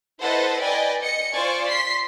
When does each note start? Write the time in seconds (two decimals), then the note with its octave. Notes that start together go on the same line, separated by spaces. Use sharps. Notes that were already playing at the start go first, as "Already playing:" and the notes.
0.22 E4 A4 B4 C5 D#5 F#5
0.62 B4 D5 D#5 G5 G#5
1.02 D#5 C#7
1.32 F4 C5 D5 G#5 C#6
1.67 C6 B6 C7